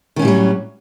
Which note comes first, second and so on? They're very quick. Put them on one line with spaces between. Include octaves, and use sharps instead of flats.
D#3 C#4 A2 G3 F#3